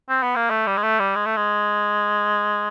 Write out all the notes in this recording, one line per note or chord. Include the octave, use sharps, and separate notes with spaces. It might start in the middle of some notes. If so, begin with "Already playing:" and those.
C4
B3
A#3
A3
G3
G#3
A3
G3
G#3
A3
G#3